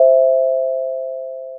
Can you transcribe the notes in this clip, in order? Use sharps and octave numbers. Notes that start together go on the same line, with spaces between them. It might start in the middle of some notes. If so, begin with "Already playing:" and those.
Already playing: C5 E5